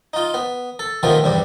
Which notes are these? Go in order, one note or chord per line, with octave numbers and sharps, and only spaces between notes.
D#4 F4
B3
A4
C3 D#3 F3 A3 B3 F4
E2 G2 C3 G3